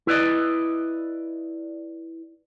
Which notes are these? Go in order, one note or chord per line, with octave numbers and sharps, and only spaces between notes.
E4 B4 D5 D#5